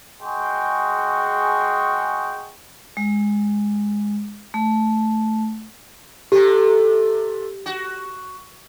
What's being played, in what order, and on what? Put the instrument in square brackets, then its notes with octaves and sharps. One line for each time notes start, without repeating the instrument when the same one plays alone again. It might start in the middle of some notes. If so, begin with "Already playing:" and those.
[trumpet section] G#3 F#4 G#4 G5 C6 C#6
[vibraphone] G#3
A3
[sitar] C3 A3 [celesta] G4
[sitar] F#4